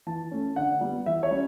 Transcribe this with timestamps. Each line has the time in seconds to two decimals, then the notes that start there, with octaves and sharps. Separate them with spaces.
0.07 E3 A5
0.31 A3 C#4
0.56 D3 F#5
0.81 G3 B3
1.06 E3 E5
1.23 C#5
1.31 G3 C#4